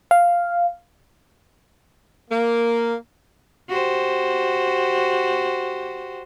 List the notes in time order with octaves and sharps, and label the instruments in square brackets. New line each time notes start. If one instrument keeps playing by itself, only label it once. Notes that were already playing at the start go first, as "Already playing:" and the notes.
[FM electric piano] F5
[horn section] A#3
[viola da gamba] F#4 G4 C5